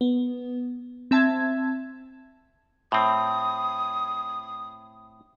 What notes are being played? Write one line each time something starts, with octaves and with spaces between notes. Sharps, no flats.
B3
C4 E5 A5 G#6
A2 C4 D#6